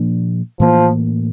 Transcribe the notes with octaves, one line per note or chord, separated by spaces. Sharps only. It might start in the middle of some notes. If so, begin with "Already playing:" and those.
Already playing: A#2 F3 A#3 D4
A2 E3 F3 A#3